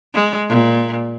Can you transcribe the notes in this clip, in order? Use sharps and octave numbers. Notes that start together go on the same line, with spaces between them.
G#3
A#2